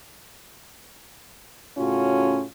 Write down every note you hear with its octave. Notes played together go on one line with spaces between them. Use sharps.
A2 C#3 C#4 F4 F#4